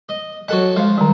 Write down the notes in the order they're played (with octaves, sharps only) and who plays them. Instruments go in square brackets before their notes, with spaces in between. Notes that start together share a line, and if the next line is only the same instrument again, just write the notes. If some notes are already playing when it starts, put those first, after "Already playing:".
[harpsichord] D#5
[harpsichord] F#3 A4 F#5 [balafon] D#5
[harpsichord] F3 [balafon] G#3 F5
[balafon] D#3 G3